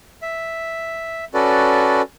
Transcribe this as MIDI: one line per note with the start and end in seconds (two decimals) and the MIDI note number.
0.22 1.25 76
1.34 2.02 61
1.34 2.02 66
1.34 2.02 69
1.34 2.02 71
1.34 2.02 74